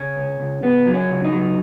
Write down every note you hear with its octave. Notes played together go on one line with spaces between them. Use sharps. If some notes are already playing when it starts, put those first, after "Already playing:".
Already playing: C#3 C#4
C#2
C#2
C#2 B3
F#3
C#4
C#2
D#4
F#3